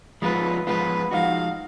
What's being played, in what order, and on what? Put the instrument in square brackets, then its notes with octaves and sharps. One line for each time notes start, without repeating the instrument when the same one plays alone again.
[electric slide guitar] F3 G#3 B3 F4 [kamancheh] B4
[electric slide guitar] F3 G#3 B3 F4 [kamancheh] B4
[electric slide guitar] F3 G#3 D#4 F#4 [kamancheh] F5